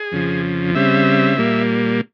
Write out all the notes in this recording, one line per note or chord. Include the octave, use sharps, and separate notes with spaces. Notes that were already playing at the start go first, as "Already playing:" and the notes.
Already playing: G#4
F2 C#3 F3
C#3 G3 C4 E5
A#2 G3 A#3